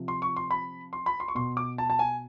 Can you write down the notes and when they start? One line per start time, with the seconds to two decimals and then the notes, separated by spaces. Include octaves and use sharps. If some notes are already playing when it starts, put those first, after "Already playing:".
Already playing: C3 F3
0.08 C6
0.22 C#6
0.36 C6
0.51 B5
0.93 C6
1.06 B5
1.20 C6
1.28 C#6
1.35 B2 C6
1.57 D6
1.78 A5
1.90 A5
1.99 G#5